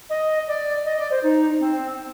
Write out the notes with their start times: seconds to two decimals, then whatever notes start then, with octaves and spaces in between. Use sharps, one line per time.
0.10 D#5
0.48 D5
0.85 D#5
0.98 D5
1.11 C5
1.23 D#4
1.60 C4